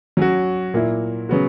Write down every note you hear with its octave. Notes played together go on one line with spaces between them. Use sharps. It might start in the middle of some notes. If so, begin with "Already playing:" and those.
F#3 C#4 F#4
A#2 A#3 E4
C#3 F#3 B3 F#4